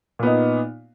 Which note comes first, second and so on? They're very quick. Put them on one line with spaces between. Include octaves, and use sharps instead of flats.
A#2 B3 D#4